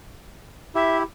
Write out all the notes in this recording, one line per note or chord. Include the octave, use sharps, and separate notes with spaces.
E4 G4 E5